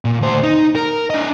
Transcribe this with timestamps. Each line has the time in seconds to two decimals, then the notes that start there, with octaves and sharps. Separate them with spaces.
0.05 A#2
0.21 D2 C5
0.43 D#4
0.75 A#4
1.10 D4 D#5